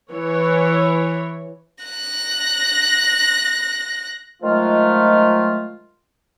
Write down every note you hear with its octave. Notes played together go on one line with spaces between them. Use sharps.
E3 C#5
F#6 A#6
D#3 F3 F#3 G#3 A3 F4